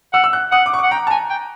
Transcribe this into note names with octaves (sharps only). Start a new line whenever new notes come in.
F#5 E6
E6
F#6
F#5 D#6
D6
C#6
F#5 D6
G5 A#5
A5
G#5 A#5
G5